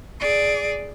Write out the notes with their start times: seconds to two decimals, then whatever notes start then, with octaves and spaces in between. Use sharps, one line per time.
0.20 G#4 D5